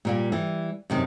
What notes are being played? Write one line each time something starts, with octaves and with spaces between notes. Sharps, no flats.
A#2 G3 A#3
E3 G3
F#2 C3 D#3